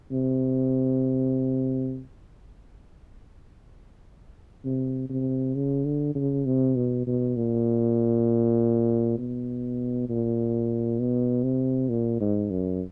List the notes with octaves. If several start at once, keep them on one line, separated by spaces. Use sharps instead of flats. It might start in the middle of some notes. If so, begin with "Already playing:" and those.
C3
C3
C3
C#3
D3
C#3
C3
B2
B2
A#2
B2
A#2
B2
C3
A#2
G#2
F#2